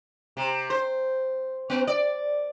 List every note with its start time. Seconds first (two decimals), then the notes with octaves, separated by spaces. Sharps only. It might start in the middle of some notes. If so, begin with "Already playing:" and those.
0.37 C3
0.70 C5
1.70 B3
1.87 D5